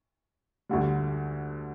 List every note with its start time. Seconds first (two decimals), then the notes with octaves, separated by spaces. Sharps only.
0.69 D2 D3 G3